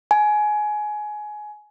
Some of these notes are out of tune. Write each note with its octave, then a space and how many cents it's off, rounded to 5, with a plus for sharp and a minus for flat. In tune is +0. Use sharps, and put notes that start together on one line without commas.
G#5 +20